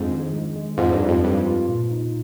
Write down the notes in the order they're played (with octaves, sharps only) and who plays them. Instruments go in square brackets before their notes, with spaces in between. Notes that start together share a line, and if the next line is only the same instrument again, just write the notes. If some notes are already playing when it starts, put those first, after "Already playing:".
Already playing: [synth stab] F2 G#2 [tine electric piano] D4
[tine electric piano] D#3
G#3
G#3
[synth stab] F2 G#2 [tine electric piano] C4
[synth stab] G2
[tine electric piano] F4
[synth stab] F2
[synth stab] G2 [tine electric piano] G3
[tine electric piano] F4
A#2
D#4